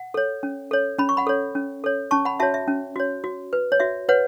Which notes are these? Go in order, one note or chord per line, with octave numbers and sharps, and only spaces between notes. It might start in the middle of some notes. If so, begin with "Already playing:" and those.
Already playing: F#5
A4 C#5
C#4
A4 C#5
C#4 B5
C#6
F#5 B5
A4 C#5
C#4
A4 C#5
C#4 A5 C#6
F#5 B5
F#4 C#5 E5 A5
E5
C#4
F#4 C#5
F#4
B4
C#5
F#4 E5
B4 C#5 F#5